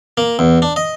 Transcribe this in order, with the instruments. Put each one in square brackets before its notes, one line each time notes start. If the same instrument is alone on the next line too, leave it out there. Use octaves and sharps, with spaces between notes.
[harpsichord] A#3
E2
D4
D#5